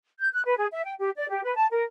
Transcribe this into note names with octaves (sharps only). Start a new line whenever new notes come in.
G6
F#6
B4
G#4
E5
G5
G4
D5
G4
B4
A5
A#4